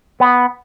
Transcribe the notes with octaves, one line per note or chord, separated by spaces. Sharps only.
B3